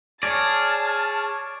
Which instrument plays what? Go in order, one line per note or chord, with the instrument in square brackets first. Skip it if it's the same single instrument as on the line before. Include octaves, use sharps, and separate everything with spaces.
[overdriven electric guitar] G#4 [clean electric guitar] C#5 D5 [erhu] A5 [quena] F6